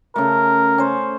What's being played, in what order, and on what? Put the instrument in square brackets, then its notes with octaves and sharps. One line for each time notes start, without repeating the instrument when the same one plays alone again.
[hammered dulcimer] C#3 A3 [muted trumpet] A#4
[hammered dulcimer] C#4 C5